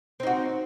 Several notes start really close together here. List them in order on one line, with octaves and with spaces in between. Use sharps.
C4 D#4 F#4